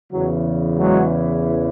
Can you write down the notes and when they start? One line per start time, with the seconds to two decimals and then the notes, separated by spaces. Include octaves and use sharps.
0.12 E2 C#3 E3 F#3
0.78 F#3 G#3